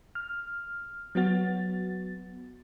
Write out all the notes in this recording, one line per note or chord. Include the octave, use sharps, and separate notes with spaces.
F6
F#3 B3 F#4 A6